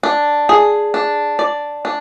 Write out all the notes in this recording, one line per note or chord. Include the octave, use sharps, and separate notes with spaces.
D4
G#4
D4
D5
D4